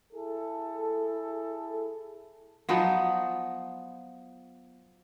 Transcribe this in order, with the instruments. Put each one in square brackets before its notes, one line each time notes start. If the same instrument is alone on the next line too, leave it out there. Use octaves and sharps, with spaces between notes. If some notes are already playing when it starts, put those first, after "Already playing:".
[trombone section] E4 G#4 A4
[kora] F3 F#3 B3 D#4